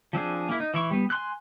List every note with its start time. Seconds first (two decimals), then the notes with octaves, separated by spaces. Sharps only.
0.13 F3 C4 D4 G#4
0.49 A#3 E4
0.60 D#4
0.74 E3 E4 C#6
0.91 G3 B3
1.10 G#5 C6 F#6